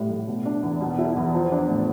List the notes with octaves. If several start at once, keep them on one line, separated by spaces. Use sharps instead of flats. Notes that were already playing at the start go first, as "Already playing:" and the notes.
Already playing: A2 G3
A2
B2
D4
E2
B2
E4
E2
F3
D4
A2